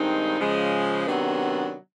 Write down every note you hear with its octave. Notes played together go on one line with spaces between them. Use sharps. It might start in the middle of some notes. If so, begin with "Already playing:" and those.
Already playing: G2 D#3 G#3 C4 D#4
C#3 F3 G#3
C3 D#3 F#3 B3 D4